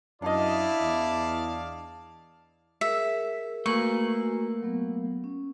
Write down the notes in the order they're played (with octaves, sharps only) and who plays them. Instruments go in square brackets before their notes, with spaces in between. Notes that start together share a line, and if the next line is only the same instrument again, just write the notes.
[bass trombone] F#2 [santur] D4 D#5 [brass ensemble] E4 [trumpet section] D5 F5 A5
[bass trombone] E2
[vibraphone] G#4 A#4 [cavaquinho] E5
[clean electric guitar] A3 A#3 B4 [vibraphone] F#4 G#5 A#5 [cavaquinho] C#6
[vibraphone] F#3 B3
C#4